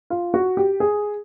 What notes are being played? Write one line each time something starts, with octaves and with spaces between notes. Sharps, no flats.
F4
F#4
G4
G#4